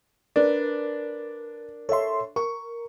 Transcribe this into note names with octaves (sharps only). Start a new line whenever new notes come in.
D4 A#4 B4
A4 C#5 E5 C6
A#4 C#6